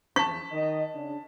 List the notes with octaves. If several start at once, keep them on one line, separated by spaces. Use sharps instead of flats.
E2 A5 C#6 B6
D#3 D#5
C#3 D4